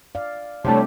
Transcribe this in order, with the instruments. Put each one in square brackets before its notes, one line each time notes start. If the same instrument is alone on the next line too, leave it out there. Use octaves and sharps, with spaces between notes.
[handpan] D5 F5
[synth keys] C3 G3 A3 [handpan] D4 E4 G4 [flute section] C#5 A5